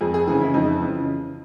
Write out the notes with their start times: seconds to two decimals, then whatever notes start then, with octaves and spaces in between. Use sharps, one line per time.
0.01 F2 G#4
0.14 G#4
0.27 C#3 E3 G#4
0.41 E4
0.54 F2 D#4
0.81 C#3 E3